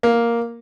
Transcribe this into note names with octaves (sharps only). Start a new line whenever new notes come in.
A#3